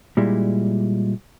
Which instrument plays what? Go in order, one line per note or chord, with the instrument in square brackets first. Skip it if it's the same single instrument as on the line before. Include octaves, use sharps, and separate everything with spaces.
[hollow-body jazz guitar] A#2 G3 G#3 E4